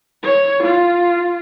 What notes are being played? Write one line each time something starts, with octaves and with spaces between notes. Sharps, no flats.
C#5
F4